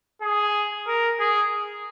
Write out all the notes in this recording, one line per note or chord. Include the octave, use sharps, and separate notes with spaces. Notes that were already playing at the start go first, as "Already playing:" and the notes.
G#4
A#4
G#4